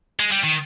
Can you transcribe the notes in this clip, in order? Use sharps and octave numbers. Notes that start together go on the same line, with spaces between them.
G#3
G3
D#3